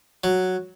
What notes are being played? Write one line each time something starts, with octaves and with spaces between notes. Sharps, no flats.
F#3